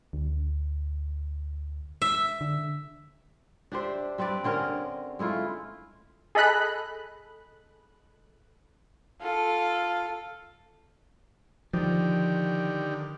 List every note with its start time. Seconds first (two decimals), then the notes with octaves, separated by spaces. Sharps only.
0.13 D2
2.02 E5
2.41 D3
3.72 D4 G4 C5 E5
4.18 G3 C4 B4 D5
4.44 D3 C4 C#4 A#4
5.19 G#3 A3 E4 F4
6.35 G#4 A4 D#5 B5 F#6
9.21 F4 A4
11.73 D3 D#3 F3 G4